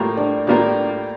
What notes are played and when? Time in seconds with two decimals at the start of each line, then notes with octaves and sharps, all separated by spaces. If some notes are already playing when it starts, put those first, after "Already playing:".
Already playing: A2 G3 A#3 F4 A#4
0.17 D4 D5
0.47 A2 G3 A#3 D4 F4 A#4 D5